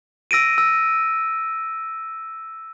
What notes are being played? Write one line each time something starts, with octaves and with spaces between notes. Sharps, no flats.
E6 A#6 D7 D#7
E6